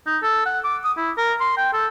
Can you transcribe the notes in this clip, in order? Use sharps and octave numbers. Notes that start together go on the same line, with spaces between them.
D#4
A4
F#5
D6
D#6
E4
A#4
C6
G5
A4